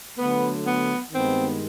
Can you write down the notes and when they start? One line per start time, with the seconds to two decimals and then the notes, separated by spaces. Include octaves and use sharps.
0.18 D3 F#3 A3 B3
0.64 B3
1.12 G2 D#3 G#3 B3 C4